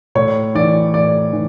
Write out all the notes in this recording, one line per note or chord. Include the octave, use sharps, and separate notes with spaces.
A2 C#5
E3 D5
A2 D5
E3